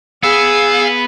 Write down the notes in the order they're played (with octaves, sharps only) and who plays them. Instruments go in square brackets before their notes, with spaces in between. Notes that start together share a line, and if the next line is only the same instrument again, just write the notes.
[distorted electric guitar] B3 [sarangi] G#4 [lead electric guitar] F5 [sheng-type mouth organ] E6